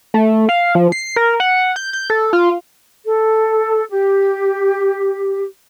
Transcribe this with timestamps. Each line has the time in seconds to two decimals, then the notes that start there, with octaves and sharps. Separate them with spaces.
0.14 A3
0.49 F5
0.75 F3
0.92 C7
1.16 A#4
1.40 F#5
1.76 G6
1.93 G6
2.10 A4
2.33 F4
3.04 A4
3.89 G4